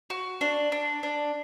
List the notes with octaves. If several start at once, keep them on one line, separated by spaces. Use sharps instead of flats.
F#4
D4
D4
D4